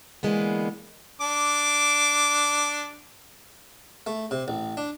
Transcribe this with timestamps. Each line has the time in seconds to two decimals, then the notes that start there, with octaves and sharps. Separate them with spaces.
0.23 D3 E3 G#3 A#3 B3
1.21 D4 D6
4.07 A3
4.31 C3
4.48 A1
4.77 D4